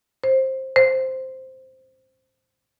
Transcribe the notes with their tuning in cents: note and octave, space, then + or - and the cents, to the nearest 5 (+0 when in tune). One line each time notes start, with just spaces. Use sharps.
C5 +15
C5 +0